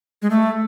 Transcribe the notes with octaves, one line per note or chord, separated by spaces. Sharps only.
G#3
A3